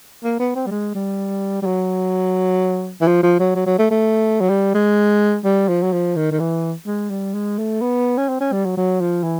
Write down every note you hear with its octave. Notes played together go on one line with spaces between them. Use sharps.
A#3
B3
C4
G3
G#3
G3
G3
F#3
E3
F3
F3
F#3
F#3
F#3
A3
A3
F#3
G3
G#3
G3
F3
F#3
F3
D#3
D#3
E3
G#3
G3
G#3
A3
B3
C#4
C4
C#4
G3
F#3
F#3
F3
E3